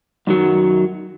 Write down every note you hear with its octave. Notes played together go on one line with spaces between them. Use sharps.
F#2 D#3 F#3